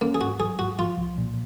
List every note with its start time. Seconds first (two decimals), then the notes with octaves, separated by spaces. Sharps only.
0.01 A#3 C#4
0.15 G#4
0.21 G#2 F#4
0.40 F#3 G#4
0.59 G#2 F#4
0.79 F3 F4
0.98 C2
1.18 A#2